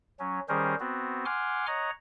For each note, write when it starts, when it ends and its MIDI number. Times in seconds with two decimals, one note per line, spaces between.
0.20 0.40 54
0.20 0.40 61
0.49 0.75 51
0.49 0.75 55
0.49 0.75 61
0.49 0.75 68
0.49 0.75 70
0.49 0.75 72
0.80 1.25 59
0.80 1.25 60
0.80 1.25 66
1.25 1.66 78
1.25 1.66 80
1.25 1.66 84
1.25 1.66 86
1.25 1.66 89
1.67 1.90 73
1.67 1.90 75
1.67 1.90 78
1.67 1.90 82